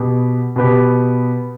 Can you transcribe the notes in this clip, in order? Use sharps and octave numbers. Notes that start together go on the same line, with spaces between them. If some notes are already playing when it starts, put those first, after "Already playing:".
Already playing: B2 B3 G4
B2 B3 G4